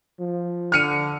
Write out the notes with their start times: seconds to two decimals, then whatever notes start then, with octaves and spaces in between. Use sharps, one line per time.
0.20 F3
0.72 D3 F6 C#7 D#7